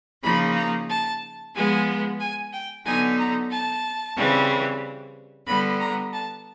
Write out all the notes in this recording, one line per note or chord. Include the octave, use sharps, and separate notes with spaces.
C#3 F3 A#3 D#4 B5
A#5
A5
F3 G#3 B3 G#5
G#5
G5
D3 F#3 B3 D#4 G#5
A#5
A5
C#3 E3 G3 C4
D3 G3 B3 B5
A#5
A5